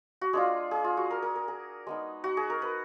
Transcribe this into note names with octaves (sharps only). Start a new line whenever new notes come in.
F#4
G#3 D4 F4 G#4
G#4
F4
F#4
A#4
A#4
A#4
G#4
G#3 B3 D#4
F#4
G#4
A#4
B4